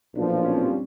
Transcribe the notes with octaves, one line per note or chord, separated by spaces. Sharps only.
B1 A#2 F3 D4
D4
C#4
C4
G3